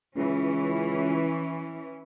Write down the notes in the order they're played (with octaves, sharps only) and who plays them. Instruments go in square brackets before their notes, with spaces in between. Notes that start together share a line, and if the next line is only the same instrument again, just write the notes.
[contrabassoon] C#2 [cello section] E3 C#4